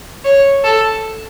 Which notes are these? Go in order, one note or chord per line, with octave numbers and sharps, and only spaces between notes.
C#5
A4